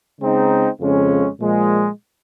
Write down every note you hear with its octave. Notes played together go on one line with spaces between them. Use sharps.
C#3 G#3 C4 D#4
F2 C#3 G#3 C#4
A#2 F3 G#3